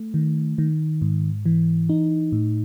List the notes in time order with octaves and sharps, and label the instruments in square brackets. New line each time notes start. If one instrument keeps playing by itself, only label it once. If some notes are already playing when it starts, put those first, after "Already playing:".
Already playing: [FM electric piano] A3
D#3
D#3
G#2
E3
D#4
A2